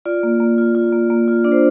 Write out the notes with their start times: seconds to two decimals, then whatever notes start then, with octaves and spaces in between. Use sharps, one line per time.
0.06 F4 D5
0.23 A#3
0.40 A#3
0.58 F4
0.75 F4
0.92 A#3
1.10 A#3
1.28 F4
1.44 D4 D5
1.52 C5